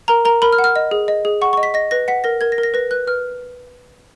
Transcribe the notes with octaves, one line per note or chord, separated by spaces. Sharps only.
A#4 A#5
A#4 A#5
A#4 B5
F6
F#5
F6
D#5
G#4
D#5
G#4
F#5 C#6
C#6
D#5
B6
D#5 A#6
B4 A#6
F#5 B6
A#4 A#6
A#4 G#6
A#6
A#4
A#6
B4 A#6
B4 F#6
B4 F6